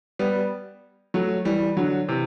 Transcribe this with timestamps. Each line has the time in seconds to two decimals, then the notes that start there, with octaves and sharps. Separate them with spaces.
0.19 G3 B3
1.14 F#3 A3
1.45 E3 G3
1.77 D3 F#3
2.08 C3 E3